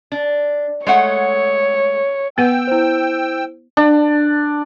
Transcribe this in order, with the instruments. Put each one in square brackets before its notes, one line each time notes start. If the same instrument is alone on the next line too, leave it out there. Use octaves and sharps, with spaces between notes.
[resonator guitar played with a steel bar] D4
[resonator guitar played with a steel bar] G#3 A3 F#5 [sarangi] C#5
[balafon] B3 B4 F#5 [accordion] G5 E6
[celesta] E4 C5
[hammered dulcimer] D4